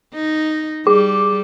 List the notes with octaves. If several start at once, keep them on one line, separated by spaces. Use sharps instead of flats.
D#4
G3 G#4 D6